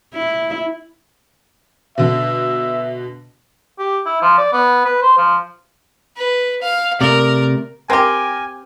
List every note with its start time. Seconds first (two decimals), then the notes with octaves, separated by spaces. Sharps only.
0.14 E4
1.98 B2 D3 E5
3.79 G4
4.06 E4
4.22 F3
4.38 D5
4.52 B3
4.85 B4
5.02 C5
5.18 F3
6.16 B4
6.62 F5
7.01 C3 A3 A#4 D5
7.90 C4 G4 A#4 G5 G#5